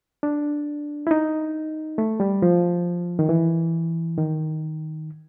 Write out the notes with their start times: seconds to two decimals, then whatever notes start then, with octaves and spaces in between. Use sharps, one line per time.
0.23 D4
1.07 E4
1.11 D#4
1.98 A3
2.20 G3
2.42 F3
3.19 D#3
3.29 E3
4.18 D#3